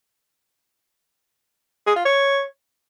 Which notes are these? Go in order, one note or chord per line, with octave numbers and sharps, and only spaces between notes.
G#4
F4
C#5